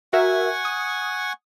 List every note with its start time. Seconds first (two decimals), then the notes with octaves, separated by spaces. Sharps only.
0.13 F#4 A#4 E5 F#5 G#5 C#6
0.65 D#6